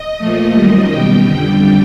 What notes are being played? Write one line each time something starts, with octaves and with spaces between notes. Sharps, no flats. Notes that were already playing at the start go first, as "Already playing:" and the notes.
Already playing: D#5
A#2 F3 A3
F#2 D#3 G3 D#5
B2 G3 G5
F2 D3 G3